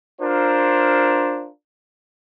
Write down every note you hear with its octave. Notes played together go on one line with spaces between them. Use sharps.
D4 F4 A#4 C5